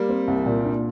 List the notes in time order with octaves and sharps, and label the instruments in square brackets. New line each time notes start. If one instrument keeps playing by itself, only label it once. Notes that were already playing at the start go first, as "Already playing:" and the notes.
Already playing: [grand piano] G3 A#3
[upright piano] C4
C2
A#2
D4